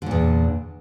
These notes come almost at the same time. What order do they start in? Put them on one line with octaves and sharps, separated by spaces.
D3 A#2 E2